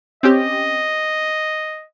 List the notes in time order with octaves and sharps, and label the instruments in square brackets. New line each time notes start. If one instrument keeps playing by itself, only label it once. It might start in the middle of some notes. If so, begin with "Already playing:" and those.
[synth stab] C4 C#4 G4 [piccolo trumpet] D#5